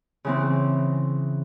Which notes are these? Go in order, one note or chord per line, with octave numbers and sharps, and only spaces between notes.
C#3 E3 C4